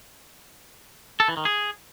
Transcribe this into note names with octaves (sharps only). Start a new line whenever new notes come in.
A4
E3
D#3
G#4